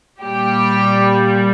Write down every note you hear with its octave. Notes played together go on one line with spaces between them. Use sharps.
A#2 G3 G4